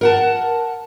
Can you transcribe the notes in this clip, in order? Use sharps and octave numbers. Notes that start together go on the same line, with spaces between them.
A#4 F#5 A5